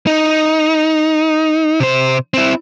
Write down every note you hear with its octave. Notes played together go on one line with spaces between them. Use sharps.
D#4
C3 C5
C4 E4